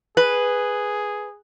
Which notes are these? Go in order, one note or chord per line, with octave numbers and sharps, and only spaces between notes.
G#4 B4